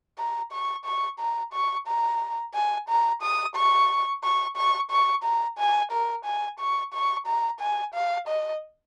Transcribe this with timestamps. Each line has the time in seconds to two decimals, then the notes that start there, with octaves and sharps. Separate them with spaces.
0.19 A#5
0.52 C#6
0.85 C#6
1.19 A#5
1.53 C#6
1.87 A#5
2.54 G#5
2.89 A#5
3.22 D#6
3.55 C#6
4.24 C#6
4.57 C#6
4.91 C#6
5.24 A#5
5.59 G#5
5.91 A#4
6.25 G#5
6.60 C#6
6.93 C#6
7.27 A#5
7.60 G#5
7.94 F5
8.28 D#5